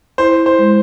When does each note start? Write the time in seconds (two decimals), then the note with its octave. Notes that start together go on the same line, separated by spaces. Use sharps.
0.18 E4 C5
0.46 C5
0.58 G#3